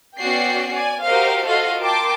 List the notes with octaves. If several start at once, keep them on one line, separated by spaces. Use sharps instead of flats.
B3 C#4 F#4 D5 G5 C7
D5 G#5
F#4 G4 A#4 C5 D#5 F5
F4 F#4 A4 D#5 F5
A#4 G5 A5 C6 D6